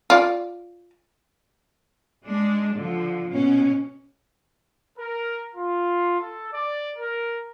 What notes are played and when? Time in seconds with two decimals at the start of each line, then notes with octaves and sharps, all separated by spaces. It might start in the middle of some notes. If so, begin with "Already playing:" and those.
0.10 F4 D5
2.27 G#3 D4
2.73 D3 F3
3.32 B2 C#4
4.98 A#4
5.55 F4
6.19 A4
6.52 D5
6.96 A#4